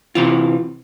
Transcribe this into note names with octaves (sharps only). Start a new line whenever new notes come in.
C3 E3 F4